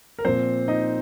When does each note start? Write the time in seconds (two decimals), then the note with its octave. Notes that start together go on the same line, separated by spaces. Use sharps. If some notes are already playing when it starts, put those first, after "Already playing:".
0.19 A#4
0.25 A#2 F3 C4 C5
0.68 D#4 D#5